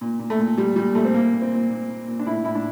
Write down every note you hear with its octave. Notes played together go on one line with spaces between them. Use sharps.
A#2
A#2
A3
A#2
A#2 G3
A#2 G3
A#2 A3
C4
A#2 A#3
A#2
C4
A#2
A#2
A#2
A#2
D4
A2 E4
A2 E4
D4